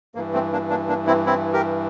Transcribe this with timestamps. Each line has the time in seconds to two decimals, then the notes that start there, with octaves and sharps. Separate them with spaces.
0.15 G2 E3 A#3
0.34 A3 C4
0.52 A#3 D4
0.70 A#3 D4
0.89 A#3 D4
1.07 C4 E4
1.26 C4 E4
1.53 G4 A#4